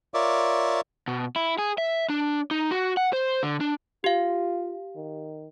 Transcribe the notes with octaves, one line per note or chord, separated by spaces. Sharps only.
F4 A#4 C#5 D5 E5 D6
B2
E4
G#4
E5
D4
D#4
F#4
F#5
C5
D3
D4
F4 G4 F5
D#3